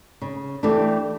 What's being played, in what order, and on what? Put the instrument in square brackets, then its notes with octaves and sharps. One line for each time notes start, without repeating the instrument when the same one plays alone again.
[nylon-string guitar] C#3
E3 A3 D4 G4